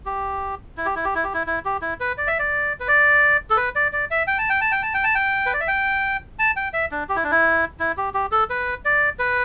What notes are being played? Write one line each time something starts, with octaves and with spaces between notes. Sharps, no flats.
G4
E4
G4
E4
G4
E4
G4
E4
E4
G4
E4
B4
D5
E5
D5
B4
D5
A4
B4
D5
D5
E5
G5
A5
G5
A5
G5
A5
G5
A5
G5
B4
D5
E5
G5
A5
G5
E5
D4
G4
E4
D4
E4
E4
G4
G4
A4
B4
D5
B4